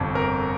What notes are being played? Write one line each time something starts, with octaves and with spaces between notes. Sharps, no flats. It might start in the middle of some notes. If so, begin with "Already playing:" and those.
Already playing: G1 F2 C3 F3
A#4